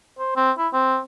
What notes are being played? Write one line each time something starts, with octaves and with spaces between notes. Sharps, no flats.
C5
C4
E4
C4